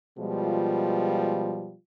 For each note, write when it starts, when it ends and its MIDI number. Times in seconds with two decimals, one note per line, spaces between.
0.19 1.74 47
0.19 1.74 53
0.19 1.74 55
0.19 1.74 56
0.19 1.74 65